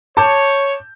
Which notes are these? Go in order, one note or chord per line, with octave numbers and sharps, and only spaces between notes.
C#5 A5 D6 G6